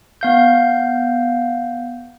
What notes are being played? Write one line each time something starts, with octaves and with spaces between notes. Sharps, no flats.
B3 F5 G6